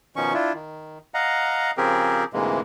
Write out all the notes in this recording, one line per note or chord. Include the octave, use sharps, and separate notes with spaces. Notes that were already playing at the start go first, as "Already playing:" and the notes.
B2 D#3 F3 C#4 C#6
D4 E4 F4
D#3
D#5 F5 F#5 A#5
C#3 F3 C4 G4 G#4 A#4
D2 G#2 C3 E3 G#3 A#3